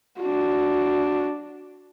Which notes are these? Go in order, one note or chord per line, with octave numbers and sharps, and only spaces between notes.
D4 F#4